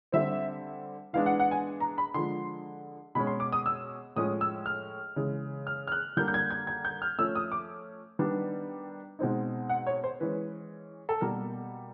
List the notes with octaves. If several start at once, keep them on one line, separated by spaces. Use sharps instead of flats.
D3 G3 C4 E5
E3 G#3 B3 D4 F5
F#5
F#5
G#5
A#5
B5
D3 F3 G#3 C6
B2 G#3 C#4 B5
C6
D6
D#6
E6
A2 F3 G#3 C#4 D#6
E6
F6
C#3 E3 G#3
F6
F6
F#6
D3 G3 A#3 D4 G6
G6
G#6
G#6
G#6
G6
F6
F3 A3 C#4 E6
D#6
D6
D#3 G3 B3 D4
B2 G#3 C4 D#4
F#5
C#5
C5
E3 G#3 C#4 B4
A4
B2 G3 A#3 A#4